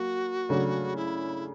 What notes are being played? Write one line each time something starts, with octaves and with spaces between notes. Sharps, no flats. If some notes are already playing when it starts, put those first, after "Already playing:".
Already playing: F#3 A#3 F#4
C#3 F#3 A3 D4
E4